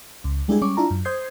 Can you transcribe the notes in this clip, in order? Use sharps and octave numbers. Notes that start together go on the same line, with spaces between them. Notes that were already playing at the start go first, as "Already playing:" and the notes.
C#2
G3 G#3 D4 E4 G4 G#4
G3 C#4 C#6 D6
D4 E4 F4 A5 A#5
F#2
C5 D#6 G6 G#6 C7